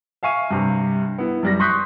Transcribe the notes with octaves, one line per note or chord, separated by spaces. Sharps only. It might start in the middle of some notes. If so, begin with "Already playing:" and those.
E5 F5 G#5 C#6 D#7
G2 C3
B3 E4
F#2 G3 A#6
C6 C#6 D#6 F#6 G6 B6